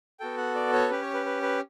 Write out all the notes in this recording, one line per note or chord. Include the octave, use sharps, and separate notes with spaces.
B3 F#4 A4 G5
F#5
D5
C#5
C#4 G4 B4
C#5
B4
B4
B4